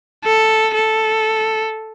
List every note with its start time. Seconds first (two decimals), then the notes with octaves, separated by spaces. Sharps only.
0.24 A4
0.74 A4